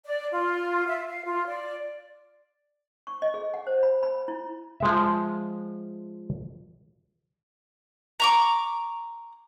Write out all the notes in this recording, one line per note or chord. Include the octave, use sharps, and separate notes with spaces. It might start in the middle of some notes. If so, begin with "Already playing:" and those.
D5
F4
E5
F5
F4
D5
C#6
D#5
G#4
F#5
C5
B5
B5
E4
F3 G#3 E5
A#5 C#6 D6